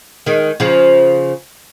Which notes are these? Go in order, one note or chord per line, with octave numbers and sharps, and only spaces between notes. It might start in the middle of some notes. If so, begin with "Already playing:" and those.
D#3 G#3
C#3 F3